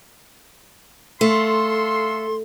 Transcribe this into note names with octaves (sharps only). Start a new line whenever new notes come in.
A3 A4 F5 C6